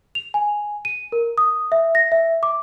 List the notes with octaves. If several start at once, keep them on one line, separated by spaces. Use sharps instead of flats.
F7
G#5
D#7
A#4
D#6
E5
A#6
E5
D6